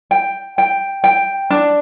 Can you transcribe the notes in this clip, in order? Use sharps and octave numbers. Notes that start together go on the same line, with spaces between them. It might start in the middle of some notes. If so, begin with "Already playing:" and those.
G5
G5
G5
D4